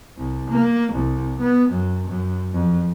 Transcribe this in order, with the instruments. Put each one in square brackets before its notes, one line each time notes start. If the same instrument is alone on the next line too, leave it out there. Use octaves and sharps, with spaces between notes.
[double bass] C2
A#3
C2
B3
F#2
F#2
F2